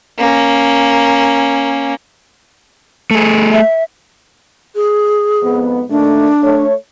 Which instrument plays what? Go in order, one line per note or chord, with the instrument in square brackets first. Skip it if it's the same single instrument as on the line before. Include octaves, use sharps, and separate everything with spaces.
[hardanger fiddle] A#3 C#4
[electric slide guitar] A3 G#4
[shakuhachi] E5
[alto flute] G#4
[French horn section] F2 G#2 B3
[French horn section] A#2 D#3 A3 [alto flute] D4
[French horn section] A3 C#5